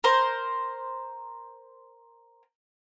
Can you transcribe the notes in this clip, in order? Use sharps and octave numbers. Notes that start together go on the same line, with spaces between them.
A#4 C5